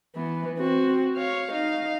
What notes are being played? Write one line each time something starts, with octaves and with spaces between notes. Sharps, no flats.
E3 B3
C4 F#4
C#5 F5
D#4 F5